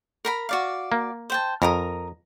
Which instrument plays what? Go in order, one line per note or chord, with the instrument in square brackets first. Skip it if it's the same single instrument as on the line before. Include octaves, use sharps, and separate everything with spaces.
[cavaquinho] A#4 A#5 B5
F#4 D5 F5
[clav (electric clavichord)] A#3
[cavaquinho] C5 G5 A5
[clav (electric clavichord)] F2 [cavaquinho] A#4 A#5 D#6